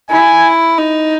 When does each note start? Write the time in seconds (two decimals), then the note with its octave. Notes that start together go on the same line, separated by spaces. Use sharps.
0.10 E4 G#5
0.78 D#4